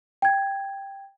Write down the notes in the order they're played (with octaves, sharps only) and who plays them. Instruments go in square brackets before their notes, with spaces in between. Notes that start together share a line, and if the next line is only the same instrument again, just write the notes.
[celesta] G5 G#6